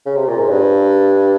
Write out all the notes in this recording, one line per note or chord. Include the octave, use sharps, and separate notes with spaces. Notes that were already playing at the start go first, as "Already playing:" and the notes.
C#3
C3
A#2
G#2
G2